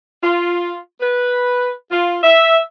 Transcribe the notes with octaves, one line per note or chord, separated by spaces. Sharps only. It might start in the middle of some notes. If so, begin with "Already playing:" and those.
F4
B4
F4
E5